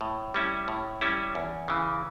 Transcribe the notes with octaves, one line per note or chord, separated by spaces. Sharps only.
A2
G3 C#4 E4
A2
G3 C#4 E4
E2
C#3 E3